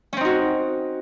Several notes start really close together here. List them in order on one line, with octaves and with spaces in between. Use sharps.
C#4 C4 D#4 F#4